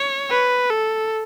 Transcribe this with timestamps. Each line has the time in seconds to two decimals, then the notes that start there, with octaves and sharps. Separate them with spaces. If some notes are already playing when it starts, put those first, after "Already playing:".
Already playing: C#5
0.31 B4
0.70 A4